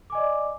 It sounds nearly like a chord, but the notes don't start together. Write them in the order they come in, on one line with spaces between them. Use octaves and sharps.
D6 G#5 D#5 D5